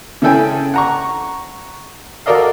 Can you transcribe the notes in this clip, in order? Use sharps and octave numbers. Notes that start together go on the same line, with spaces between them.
C#3 C#4 E4 A4 G5 G#5
F#5 A#5 C#6
F#4 A4 A#4 D5 D#5 F5